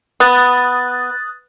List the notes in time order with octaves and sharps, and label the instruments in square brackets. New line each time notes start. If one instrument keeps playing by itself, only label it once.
[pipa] B3 [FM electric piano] D#6 F#6 A6